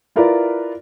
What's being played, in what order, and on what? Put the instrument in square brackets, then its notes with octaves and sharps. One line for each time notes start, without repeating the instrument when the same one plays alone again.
[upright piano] E4 F4 A#4 B4 D5